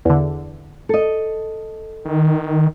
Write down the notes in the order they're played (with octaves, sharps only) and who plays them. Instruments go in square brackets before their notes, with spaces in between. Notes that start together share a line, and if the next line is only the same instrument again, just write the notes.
[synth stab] E2 D3
[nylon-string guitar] A4 D#5
[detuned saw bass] D#3